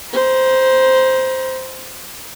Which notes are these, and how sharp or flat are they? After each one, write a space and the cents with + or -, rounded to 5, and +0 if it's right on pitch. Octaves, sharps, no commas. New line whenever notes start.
C5 +0 A#5 +40